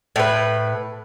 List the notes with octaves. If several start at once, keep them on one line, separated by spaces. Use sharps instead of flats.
A2 B4